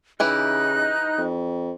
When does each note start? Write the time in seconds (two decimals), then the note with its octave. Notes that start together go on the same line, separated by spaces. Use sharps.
0.20 C#3 E3 D#4 E4 G4 F#6
1.18 F2